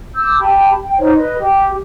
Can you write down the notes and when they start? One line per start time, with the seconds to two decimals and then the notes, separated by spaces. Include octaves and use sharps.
0.15 D6 E6 G6
0.40 G4 G5 A5 B5
0.82 G5
0.98 D#4 C5 C#5
1.16 B4 D#5
1.39 G4